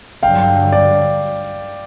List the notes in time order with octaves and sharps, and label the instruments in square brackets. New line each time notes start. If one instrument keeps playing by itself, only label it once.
[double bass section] G2 D3 F#3 [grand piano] F5 G5
[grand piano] D5